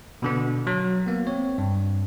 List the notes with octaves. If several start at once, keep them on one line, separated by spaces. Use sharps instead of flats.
B2 D3 B3
F#3
A#3 B3
C4 C#5
G2